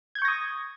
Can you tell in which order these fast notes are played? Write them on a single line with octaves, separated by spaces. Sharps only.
G#6 G6 C#6 A#6 D#6